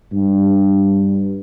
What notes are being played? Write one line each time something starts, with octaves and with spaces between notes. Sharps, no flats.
G2